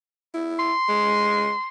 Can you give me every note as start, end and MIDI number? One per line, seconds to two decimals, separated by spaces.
0.34 0.73 64
0.59 1.68 84
0.89 1.53 56